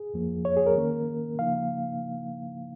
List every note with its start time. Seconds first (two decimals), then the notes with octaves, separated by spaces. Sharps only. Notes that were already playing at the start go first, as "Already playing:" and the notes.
Already playing: G#4
0.14 F2 F3 A#3
0.45 C#5
0.57 G#4
0.66 A#4
0.78 D#3 A#3 C#4
1.39 C#3 F3 A#3 D#4 F5